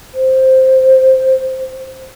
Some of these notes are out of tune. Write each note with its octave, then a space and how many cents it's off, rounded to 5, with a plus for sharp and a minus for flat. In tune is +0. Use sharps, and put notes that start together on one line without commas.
C5 +0